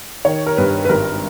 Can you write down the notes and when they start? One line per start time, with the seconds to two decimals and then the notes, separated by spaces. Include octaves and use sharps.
0.25 D#3 C#5
0.46 A#4
0.57 G2 B4
0.85 B4
0.89 G#1 A#4